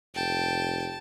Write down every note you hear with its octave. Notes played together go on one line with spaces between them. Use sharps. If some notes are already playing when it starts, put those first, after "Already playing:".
F1 G5 A5